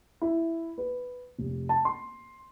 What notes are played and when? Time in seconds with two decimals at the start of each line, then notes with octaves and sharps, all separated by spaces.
0.21 E4
0.78 B4
1.38 F1
1.69 A5
1.85 C6